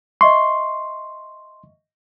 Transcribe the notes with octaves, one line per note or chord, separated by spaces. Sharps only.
D#5 E5 C6 C#6